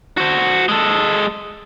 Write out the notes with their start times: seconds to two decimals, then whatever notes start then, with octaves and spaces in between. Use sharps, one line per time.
0.17 F#4 C5
0.69 G#3 A4